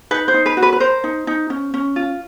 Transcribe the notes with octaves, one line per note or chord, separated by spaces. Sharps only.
D#4 B4
C5
D#4
B4
F#4
B4
B4
A#4 C5
D#4
D#4
C#4
C#4
F4